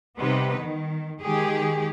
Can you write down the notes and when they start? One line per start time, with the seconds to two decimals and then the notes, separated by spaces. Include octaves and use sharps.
0.18 C3 G3 B3 D#4 B4
0.58 D#3
1.23 D#3 G#3 G4 G#4